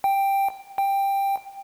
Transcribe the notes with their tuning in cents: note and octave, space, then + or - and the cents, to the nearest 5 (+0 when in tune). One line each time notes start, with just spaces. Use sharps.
G5 +5
G5 +10